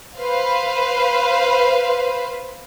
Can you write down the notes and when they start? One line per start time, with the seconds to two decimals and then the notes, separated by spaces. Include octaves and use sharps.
0.19 B4 C5 F5